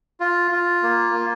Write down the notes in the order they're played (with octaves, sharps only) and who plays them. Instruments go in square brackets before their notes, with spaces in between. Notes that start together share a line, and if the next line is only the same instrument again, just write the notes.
[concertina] F4
F4
A#3
A#3